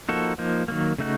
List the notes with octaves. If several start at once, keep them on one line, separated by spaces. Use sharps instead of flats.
F3 A#3 D#4 F#4 A4
F3 A#3 D#4
D#3 F#3 A#3
C#3 A3 D#4 F#4